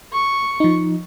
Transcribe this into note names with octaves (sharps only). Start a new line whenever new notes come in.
C#6
F3 D#4